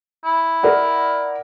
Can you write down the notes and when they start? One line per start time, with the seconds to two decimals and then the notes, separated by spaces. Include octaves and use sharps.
0.25 E4
0.63 A#4 D5 F#5